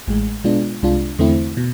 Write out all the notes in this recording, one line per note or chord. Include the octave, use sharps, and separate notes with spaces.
A1 A2 G#3
B2 G#3 B3 D4 F4
C2 C3 G#3 D4 F4
E2 D3 A3 C4 E4
B2